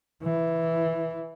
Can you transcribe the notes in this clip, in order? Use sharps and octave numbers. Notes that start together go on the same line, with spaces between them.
E3